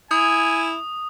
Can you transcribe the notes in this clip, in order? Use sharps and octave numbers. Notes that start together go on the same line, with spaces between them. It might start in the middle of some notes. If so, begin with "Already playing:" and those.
E4 G#5 D#6